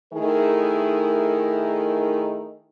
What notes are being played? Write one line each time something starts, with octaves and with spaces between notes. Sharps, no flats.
D#3 A3 D#4 E4 G#4 A#4